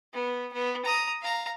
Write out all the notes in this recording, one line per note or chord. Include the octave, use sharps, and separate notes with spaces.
B3
B3
A#5 D#6
F5 A#5